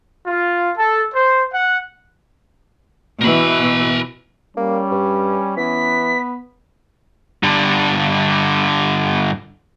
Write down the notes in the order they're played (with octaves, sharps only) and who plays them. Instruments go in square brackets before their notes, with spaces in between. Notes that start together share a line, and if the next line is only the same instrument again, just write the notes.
[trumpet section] F4
A4
C5
F#5
[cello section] B2 E3 [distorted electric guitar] A#4 B5
[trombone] G3 [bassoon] A#3 [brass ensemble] C#4
[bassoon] G2
[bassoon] E3 [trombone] B3 [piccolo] B6
[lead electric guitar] G2 D3